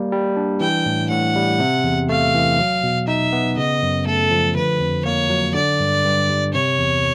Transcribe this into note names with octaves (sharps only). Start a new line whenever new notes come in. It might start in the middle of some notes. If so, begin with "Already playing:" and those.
Already playing: G3 A#3
G3
D4
E3 G5
A2
A2 F#5
G3
C3
E2
A3 F5
E3
F#3
B2
D#4 E5
B3
C#3 D#5
F#2
A3 A4
F3
D3 B4
F2
A#3 C#5
F#3
D3 D5
G2
G2
G3
C3 C#5
E2